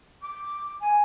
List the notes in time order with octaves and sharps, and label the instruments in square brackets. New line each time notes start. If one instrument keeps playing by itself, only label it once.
[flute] D6
G#5